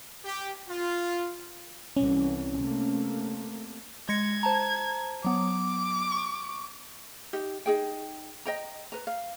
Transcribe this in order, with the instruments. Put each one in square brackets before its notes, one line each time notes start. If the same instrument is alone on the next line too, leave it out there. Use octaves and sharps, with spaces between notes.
[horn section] G4
F4
[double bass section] C2 E3 [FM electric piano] C#4
[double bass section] C3 A3 A#3
[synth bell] G#3 A#6 C#7 [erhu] G#6
[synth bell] C5 A5 A#5
[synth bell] F#3 B3 [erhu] D6
[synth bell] C#6
[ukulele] D#4 G4
D#4 G#4 G5
D#5 G5 A#5
B4 A#5
F5